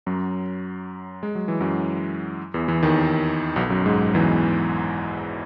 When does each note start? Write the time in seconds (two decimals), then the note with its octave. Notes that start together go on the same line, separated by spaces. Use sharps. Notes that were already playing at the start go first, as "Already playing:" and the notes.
0.06 F#2 F#3
1.23 G#3
1.35 F#3
1.48 E3
1.61 F#2 F#3
2.54 E2 E3
2.68 E2 E3
2.83 D#2 D#3
3.56 B1 B2
3.70 F#2 F#3
3.85 G#2 G#3
4.15 E2 E3